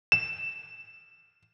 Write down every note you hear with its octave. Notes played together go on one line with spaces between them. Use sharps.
E7